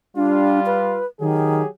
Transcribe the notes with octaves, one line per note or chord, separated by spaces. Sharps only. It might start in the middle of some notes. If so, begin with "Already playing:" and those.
G3 D4 F4
B4
D#3 F#3 G4 G#4